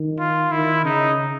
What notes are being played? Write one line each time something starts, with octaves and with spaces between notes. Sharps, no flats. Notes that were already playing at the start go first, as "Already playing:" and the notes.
Already playing: D#3
F4
D#3 E4
C#3 D#4